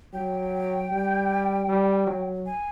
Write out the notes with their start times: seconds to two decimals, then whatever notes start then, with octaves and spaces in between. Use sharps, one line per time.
0.13 F#3 G5
0.91 G3
1.68 G3
2.07 F#3
2.46 G#5